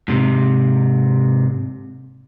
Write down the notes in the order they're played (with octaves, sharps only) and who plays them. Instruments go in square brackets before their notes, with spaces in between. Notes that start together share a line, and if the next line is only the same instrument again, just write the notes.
[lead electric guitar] G#2 C3